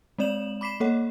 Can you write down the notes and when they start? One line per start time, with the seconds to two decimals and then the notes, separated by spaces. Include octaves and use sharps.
0.18 G#3 C4 D5 E7 F#7
0.61 B5 D6 B6 C7 E7
0.80 A#3 A4 C#5 F#5